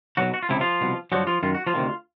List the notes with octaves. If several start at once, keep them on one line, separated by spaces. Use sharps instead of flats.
B1 B2 F#3 F#4
F#4
F4
C#2 C3 F3 E4
F3 F4
C2 B2
G2 D3 F3 F#3 F#4
F3 F4
F#2 D#3 F4
F#4
F3 F4
D2 C3 D#3